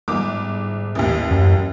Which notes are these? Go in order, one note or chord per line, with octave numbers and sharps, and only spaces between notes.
G1 G#2 D6
A1 D#2
F#2